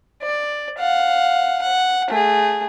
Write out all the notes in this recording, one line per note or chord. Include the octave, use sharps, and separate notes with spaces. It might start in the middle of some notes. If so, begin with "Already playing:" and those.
D5
F5 F#5
F#5
A3 G#4